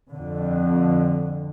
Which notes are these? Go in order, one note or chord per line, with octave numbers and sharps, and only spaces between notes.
F2 D3